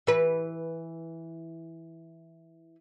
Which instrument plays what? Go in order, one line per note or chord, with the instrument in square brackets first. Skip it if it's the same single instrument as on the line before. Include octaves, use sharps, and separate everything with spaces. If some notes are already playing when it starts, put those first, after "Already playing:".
[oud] E3 B4